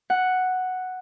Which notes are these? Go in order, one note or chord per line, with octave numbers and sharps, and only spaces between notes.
F#5